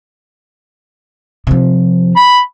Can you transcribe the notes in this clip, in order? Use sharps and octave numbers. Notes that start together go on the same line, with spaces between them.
C3 F3
B5